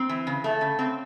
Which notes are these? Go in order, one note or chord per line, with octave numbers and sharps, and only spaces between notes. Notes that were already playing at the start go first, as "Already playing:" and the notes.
Already playing: C4
E3
C#3
A3
C#3
C4